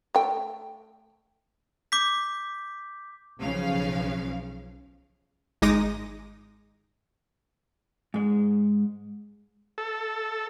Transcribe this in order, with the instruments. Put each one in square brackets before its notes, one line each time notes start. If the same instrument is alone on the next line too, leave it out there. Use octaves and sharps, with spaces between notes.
[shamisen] A3 G5
[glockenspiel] D6 G6 B6
[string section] B1 C#3 F3 F5
[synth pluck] G#1 G#3 D#4 D6 D#6 A#6
[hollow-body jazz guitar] G#2 G#3
[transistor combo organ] A4